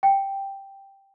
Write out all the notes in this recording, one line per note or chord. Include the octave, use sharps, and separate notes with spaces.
G5